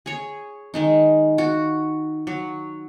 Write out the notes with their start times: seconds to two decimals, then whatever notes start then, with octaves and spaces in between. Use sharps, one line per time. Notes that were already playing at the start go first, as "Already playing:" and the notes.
0.06 G#4 C#5
0.74 D#3 G#3 D#4
1.38 F#4
2.27 F#3